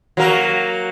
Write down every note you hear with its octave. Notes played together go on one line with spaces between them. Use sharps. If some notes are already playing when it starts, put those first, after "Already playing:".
F#3 A#3 A#4